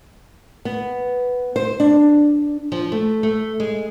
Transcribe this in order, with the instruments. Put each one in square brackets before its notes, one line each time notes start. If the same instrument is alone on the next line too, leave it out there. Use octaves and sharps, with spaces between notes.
[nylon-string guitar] B3
C5
D4
F3
A3
A3
G#3